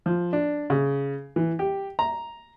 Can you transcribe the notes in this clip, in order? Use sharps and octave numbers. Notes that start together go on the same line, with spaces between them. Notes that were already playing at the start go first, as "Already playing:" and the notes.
F3
D4
C#3
E3
G4
A#5